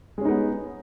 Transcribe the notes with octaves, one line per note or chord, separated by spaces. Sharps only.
G#3 B3 C#4 D#4